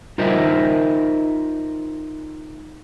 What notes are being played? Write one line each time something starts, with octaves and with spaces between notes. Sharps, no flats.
D#4 F4 A#4 C5 D#5 E5